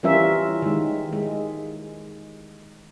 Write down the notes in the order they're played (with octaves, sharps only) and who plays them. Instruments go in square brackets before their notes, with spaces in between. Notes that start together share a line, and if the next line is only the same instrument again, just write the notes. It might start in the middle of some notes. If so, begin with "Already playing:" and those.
[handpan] E3 G3 C#4 F4 A#4 E5
D#3 G#3
G#3